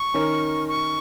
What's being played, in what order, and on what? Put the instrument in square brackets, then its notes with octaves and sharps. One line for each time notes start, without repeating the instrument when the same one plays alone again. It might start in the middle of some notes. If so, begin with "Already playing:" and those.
Already playing: [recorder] C#6
[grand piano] D#3 C#4 A#4
[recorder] C#6